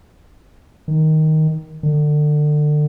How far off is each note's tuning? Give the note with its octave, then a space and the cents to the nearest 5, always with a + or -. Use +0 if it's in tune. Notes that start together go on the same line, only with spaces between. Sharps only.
D#3 +5
D3 +30